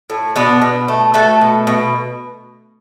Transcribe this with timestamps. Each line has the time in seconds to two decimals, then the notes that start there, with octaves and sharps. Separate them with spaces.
0.10 A2
0.36 B2 B3 D4
0.62 B2
0.88 A3
1.14 A3 F#4 A4
1.41 B2
1.67 B2